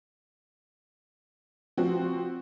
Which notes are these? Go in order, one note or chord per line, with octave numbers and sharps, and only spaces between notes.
F3 C4 F#4